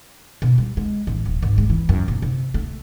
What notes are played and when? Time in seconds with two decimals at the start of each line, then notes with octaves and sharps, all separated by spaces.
0.42 B2
0.58 G3
0.77 G#3
1.07 A1
1.25 D1
1.42 G#1
1.58 G#3
1.69 E3
1.89 F#2
2.08 A#2
2.22 C3
2.54 A3